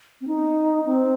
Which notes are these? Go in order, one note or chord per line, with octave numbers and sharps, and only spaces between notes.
C4
D#4
C4